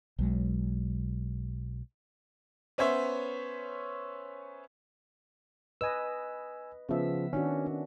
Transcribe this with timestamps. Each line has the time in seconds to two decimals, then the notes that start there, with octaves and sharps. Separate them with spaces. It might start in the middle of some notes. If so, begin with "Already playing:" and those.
0.19 B1 F#3 G#3
2.78 B3 C#4 C5 C#5 E5
5.81 B4 D#5 G#5 E6
6.89 C#3 F3 B3 E5
7.33 D#3 C#4 D4 F#4
7.66 C#4